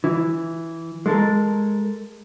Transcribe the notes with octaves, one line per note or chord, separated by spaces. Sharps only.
E3
G#3 A4 A#4